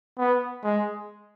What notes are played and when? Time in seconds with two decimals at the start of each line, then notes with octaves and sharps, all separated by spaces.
0.18 B3
0.64 G#3